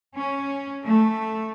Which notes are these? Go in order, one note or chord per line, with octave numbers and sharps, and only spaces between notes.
C#4
A3